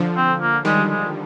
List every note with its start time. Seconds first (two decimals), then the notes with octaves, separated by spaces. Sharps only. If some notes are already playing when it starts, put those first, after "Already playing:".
Already playing: D3 F3
0.16 C4
0.41 A#3
0.65 D#3 G3 G#3
0.90 G#3